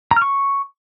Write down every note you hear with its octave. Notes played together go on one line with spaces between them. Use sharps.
A#5
F6
C#6